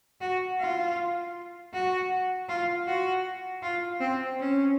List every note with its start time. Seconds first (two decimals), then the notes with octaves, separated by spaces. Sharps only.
0.21 F#4
0.60 F4
1.74 F#4
2.49 F4
2.87 F#4
3.63 F4
4.00 C4
4.39 C#4